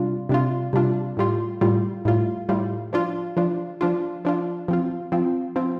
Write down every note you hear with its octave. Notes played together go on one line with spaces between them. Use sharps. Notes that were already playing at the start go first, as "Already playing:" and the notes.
Already playing: C3 G3 D4 F4
C3 G3 D4 F4
C3 G3 D4 F4
A2 G3 F4
A2 G3 F4
A2 G3 F4
A2 G3 F4
F3 D4 F4
F3 D4 F4
F3 D4 F4
F3 D4 F4
F3 C4 F4
F3 C4 F4
F3 C4 F4